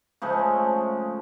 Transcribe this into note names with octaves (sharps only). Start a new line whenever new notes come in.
C#3 F3 G#3 A3